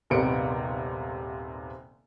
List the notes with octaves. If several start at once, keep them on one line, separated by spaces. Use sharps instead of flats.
D#1 G#1 C3 B3 C#7 D7